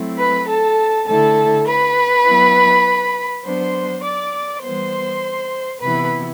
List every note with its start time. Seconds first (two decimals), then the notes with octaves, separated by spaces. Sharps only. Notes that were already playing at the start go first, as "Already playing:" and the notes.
Already playing: F#3 A3 C4 E4
0.18 B4 B5
0.48 A4 A5
1.07 D3 A3 E4 A4 A5
1.66 B4 B5
2.25 F#3 B3 E4
3.44 F#3 B3 D4 C5 C6
4.03 D5 D6
4.62 E3 G3 B3 C5 C6
5.80 C3 E3 B3 E4 B4 B5